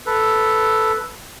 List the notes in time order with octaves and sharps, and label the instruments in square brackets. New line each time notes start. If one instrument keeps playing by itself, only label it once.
[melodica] A4 B4